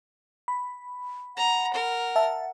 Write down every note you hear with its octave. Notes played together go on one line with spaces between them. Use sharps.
B5
F#5 A#5
A#4
E5 A5